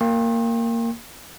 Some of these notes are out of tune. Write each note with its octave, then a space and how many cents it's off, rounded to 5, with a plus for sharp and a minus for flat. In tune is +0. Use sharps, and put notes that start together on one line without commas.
A#3 -15 G5 +15 C6 +45